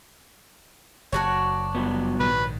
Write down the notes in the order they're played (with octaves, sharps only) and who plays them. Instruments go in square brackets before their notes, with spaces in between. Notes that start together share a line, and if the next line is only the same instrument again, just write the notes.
[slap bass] F#1 [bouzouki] D4 F#4 C#5
[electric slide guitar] G2 F#3 B3
[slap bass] A#1 G#2 D#3 [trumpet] B4